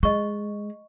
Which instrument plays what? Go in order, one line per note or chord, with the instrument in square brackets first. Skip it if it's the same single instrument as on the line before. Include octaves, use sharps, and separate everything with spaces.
[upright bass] G#3 [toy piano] D#5 C#6